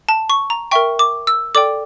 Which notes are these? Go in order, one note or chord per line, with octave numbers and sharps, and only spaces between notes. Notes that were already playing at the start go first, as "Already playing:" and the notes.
A5
C#6
A#5
A#4 E5 G5 C#6
D6
E6
A4 D5 G5 D6